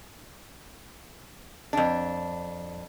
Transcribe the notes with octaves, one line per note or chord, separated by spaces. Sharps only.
F2 D4